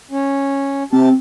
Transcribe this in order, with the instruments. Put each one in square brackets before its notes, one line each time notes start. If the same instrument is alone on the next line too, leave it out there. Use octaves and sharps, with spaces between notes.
[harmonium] C#4
[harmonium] C3 G4 A5 [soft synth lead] C4